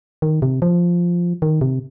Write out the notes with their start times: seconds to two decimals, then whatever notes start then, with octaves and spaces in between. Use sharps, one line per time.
0.22 D#3
0.42 C3
0.62 F3
1.42 D#3
1.61 C3